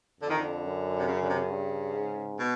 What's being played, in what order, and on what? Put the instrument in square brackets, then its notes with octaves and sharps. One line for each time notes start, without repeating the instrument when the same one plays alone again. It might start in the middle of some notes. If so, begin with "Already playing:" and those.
[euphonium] F2 [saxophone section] D3
[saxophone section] D#3
D3
[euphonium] F#2
[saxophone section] C3
C#3
D3
C3
C#3
[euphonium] G2
G#2
[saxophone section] B2